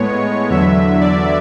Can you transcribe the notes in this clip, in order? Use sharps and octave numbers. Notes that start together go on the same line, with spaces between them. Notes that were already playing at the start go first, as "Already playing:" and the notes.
Already playing: A2 G#3 B3 C#5
E2 D3 F#3 E5
D5